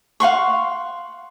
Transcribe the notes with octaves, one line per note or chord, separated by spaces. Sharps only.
F5 F#5 C6 C#6